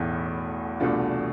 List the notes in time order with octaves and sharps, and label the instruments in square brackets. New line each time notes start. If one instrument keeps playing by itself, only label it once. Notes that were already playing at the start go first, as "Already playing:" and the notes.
Already playing: [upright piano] B1 A2 E3 A3 [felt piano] E2
[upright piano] C2 B2 A3 D4 F4